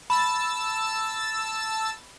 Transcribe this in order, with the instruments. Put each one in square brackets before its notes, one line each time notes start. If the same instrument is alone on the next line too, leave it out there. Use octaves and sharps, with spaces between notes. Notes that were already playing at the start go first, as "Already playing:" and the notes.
[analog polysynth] A5 E6 A6 [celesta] B5